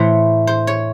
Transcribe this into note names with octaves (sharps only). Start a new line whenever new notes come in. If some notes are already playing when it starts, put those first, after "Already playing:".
Already playing: A2 E3 A3 C5
C5
C#5